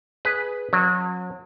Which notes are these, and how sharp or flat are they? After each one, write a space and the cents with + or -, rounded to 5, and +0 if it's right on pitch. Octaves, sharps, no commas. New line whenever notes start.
G#4 +0 B4 +0
F#3 -35 C#4 -30